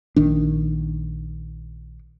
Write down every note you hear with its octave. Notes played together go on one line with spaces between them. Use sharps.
A#1 D#3 D4